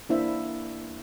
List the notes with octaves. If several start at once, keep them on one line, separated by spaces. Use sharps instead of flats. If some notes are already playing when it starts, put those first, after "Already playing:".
A#3 D4 E4 C5 E5